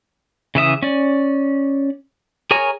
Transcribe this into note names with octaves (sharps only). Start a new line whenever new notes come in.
C#3 E3 E5 D#6
C#4 D5
G#4 A#4 C#5 G#5 A#5